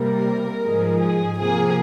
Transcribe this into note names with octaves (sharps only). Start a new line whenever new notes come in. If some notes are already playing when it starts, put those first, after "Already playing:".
Already playing: C3 G3 A#3 A#4
G#2 F3 G#3
G#4
C3 F3 A#3 G#4